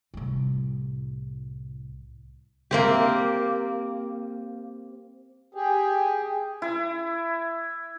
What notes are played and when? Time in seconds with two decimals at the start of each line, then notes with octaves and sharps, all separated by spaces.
0.14 C2 A2
2.71 A#3 C4 G4
5.54 G4 G#4
6.62 E4